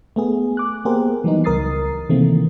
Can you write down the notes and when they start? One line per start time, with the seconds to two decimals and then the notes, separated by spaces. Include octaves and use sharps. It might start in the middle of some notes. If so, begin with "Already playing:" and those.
0.16 A3 B3 G#4
0.57 D6 F#6
0.85 A#3 B3 G4 G#4 A#4 C5
1.24 E3 F#3 G3 B3 D#4
1.44 C#2 A#4 D#6 A6 C7
2.09 C3 D#3 E3 A3 A#3 C4